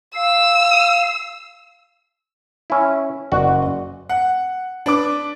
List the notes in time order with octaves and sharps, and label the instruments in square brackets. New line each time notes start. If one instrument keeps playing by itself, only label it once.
[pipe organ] F5 [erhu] E6
[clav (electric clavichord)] C#4 E4
[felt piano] F#1 D5 [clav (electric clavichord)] F#4
[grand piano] F#5
D4 B4 D6